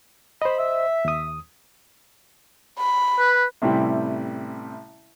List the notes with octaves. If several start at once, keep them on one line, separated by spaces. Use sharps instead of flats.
C5 D#5 B5
E5
D#2 D#6
B5
B4
A1 C3 G3 E4